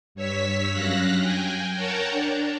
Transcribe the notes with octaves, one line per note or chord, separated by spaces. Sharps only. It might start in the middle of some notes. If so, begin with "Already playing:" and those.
G2 C#5 E6 B6
F#2 F5 F#6 A#6
G5 G#5
A#4 C#5 F#5 G5 A5 A#5
D4